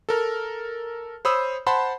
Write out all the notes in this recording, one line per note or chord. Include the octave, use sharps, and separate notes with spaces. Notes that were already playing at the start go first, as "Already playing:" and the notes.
A4 A#4 F6
C5 C#5 B5 D#6 E6
C5 F#5 A5 B5 C6